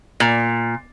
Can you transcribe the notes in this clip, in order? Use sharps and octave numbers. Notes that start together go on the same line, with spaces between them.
A#2